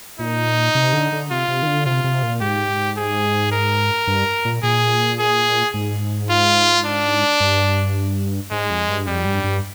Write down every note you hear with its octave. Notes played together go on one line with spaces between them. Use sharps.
A#2 D#4
C3
D3
D3
C3 F4
C3
D#3
D3
C3 F4
C3
A#2
G#2 G4
G#4
A#4
G2
A#2
A#2 G#4
G#4
G#2
F4
D4
G2
G#2 G#3
F2
G2
F2 G3
G2
G2